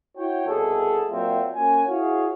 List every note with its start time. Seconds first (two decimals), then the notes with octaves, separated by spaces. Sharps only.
0.18 E4 F#4 C#5 G5
0.47 C2 B2 G#4 A4
1.10 A#2 F#3 C4 F4 C#5 E5
1.56 A#3 C#4 F#4 G#5
1.88 E4 F#4 G#4 C#5 F5